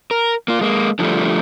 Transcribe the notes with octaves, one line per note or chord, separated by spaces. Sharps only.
A#4
A#3 F4
G#3 A#3
D3 F3 G3 A3